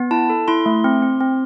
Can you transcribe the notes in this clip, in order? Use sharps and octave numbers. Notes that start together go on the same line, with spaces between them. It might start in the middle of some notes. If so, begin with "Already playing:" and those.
Already playing: B3
E4 A5
A4
E4 C6
A3
C4
C4
C4